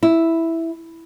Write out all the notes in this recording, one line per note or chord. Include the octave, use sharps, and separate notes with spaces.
E4